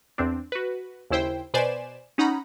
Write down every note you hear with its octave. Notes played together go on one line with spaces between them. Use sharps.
E2 C4 D4
F#4 B4
D#2 C#3 E4 C5 G5
B2 B4 C5 D5 G#5 E7
C#4 D#4 F#5 A#5 B5